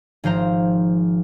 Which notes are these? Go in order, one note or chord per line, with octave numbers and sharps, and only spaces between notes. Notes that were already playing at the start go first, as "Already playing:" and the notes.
G#1 F3 C5 A#5